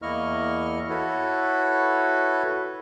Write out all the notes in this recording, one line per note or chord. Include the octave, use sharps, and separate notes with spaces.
E2 A#3 E4 D#5 C#6 F6
E4 F#4 A4 B4 C#5